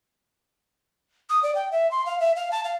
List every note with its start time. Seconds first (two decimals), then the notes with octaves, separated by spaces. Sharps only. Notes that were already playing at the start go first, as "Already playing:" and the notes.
1.30 D#6
1.43 D5
1.55 G5
1.72 E5
1.91 C6
2.06 F5
2.20 E5
2.36 F5
2.51 A5
2.64 F5